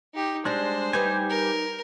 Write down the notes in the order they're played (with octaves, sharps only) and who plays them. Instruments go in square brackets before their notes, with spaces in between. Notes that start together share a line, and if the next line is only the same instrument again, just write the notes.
[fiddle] D#4 G4
[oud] G3 D#5 [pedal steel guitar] G#3 D4 [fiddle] C5
[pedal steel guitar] G3 G4 G#5 [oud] D#4 B4
[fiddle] A#4